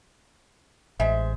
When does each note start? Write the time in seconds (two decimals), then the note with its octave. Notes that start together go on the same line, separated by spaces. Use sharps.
0.99 A1 G#3 C5 E5